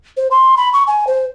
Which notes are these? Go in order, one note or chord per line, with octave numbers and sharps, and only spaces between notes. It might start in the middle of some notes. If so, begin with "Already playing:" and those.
C5
C6
B5
C#6
G#5
C5